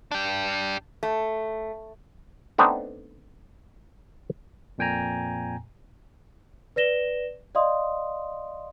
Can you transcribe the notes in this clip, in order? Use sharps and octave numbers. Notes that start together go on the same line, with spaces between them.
D4 G4
A3
A3 B3 C4 D4 D#4
F2 A#2 G5 G#5 A#5
B4 D5 A#6 E7 G7
D5 D#5 F5 C6 D#6